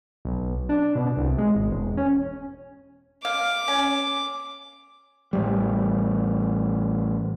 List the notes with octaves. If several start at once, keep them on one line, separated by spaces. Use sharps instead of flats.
B1
D4
B2
C2
G#3
G#1
E1
C#4
F5 D6
C#4
A1 G3